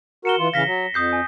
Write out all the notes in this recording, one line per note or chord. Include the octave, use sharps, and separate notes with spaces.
F#4 A#4 C#7 E7 G7
E3 F4
C#3 E3 F5 A#6 B6 G7
F#3
F2 D#6 G6 C7
G#5 D#6